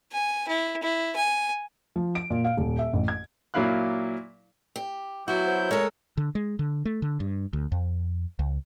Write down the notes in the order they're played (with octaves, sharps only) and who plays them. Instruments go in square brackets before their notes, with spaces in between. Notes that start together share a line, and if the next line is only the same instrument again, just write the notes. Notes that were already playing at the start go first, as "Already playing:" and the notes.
[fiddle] G#5
E4
E4
G#5
[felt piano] F3
D7
A#2
F5
D#1
E5
A1
G#6
[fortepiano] A#2 F#3 A#3 E4 F5 F#6
[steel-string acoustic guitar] G4
[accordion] F#3 G6 [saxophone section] B3 E4 [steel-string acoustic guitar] F#4
[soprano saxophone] C5
[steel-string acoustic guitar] G#3 A4 [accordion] A#4 [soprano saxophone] C#5
[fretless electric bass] D3
G#3
D3
A3
D3
G2
D2
F2
C#2